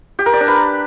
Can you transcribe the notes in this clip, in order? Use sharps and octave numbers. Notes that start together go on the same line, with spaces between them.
G4
A#4
D5
D4
B4